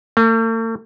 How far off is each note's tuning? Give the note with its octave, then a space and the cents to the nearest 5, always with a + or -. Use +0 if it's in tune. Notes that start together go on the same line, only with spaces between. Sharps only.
A3 +45